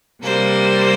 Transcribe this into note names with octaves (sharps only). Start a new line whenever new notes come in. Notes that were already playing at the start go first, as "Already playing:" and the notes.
C3 G3 A#3 C5